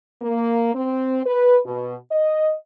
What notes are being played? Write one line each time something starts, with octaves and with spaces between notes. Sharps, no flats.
A#3
C4
B4
B2
D#5